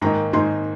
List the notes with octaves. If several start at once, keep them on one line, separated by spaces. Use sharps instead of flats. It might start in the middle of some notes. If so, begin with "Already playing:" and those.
G#2 D#3 A#3 D#4 A#5
G#2 D#3 A#3 D#4 C6